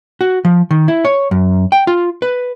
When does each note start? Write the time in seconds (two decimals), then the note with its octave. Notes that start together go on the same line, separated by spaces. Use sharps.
0.21 F#4
0.45 F3
0.71 D#3
0.88 E4
1.05 C#5
1.31 F#2
1.72 G5
1.87 F4
2.22 B4